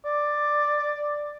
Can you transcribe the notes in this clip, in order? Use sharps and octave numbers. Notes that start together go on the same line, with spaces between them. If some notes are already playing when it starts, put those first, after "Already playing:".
D5